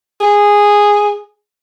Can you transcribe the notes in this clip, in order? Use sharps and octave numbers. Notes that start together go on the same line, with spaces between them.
G#4